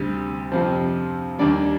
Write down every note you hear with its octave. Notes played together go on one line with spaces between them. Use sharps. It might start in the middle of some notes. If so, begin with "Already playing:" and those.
Already playing: D2 C3 G3
F2 C3 F3
D#2 D3 G3 D5